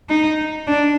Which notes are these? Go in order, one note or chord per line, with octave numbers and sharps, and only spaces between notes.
D#4
D4